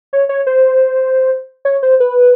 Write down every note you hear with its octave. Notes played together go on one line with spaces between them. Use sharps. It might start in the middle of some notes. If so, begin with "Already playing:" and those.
C#5
C#5
C5
C#5
C5
B4